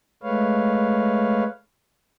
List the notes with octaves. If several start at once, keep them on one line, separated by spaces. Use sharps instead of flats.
G#3 A3 B4 C#5 F5